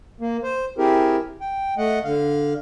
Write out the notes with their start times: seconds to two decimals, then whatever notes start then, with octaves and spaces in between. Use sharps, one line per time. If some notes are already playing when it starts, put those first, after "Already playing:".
0.20 A#3
0.44 C5
0.78 C4 E4 G4 G#4 A#4
1.41 G5
1.78 A3 D#5 F#5
2.04 D3 F5